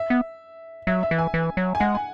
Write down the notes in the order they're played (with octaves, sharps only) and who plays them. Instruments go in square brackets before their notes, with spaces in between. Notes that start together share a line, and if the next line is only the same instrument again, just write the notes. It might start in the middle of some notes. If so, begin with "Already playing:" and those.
Already playing: [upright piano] E5
[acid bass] B3
[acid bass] F#3 [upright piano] E5
[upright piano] E5
[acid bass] E3
[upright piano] G#5
[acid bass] E3
F#3
[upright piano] G#5
[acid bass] G#3 [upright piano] F#5
[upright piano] G#5